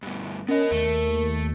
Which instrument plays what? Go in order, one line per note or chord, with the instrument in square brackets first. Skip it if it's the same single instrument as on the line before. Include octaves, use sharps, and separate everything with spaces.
[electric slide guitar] G2 B2
[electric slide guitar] B3 D#5 [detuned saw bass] C#4 [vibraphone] A#4
[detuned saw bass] D#2 [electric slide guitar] A3